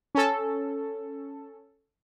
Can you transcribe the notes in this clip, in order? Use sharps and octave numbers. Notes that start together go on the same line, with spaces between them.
C#4 A4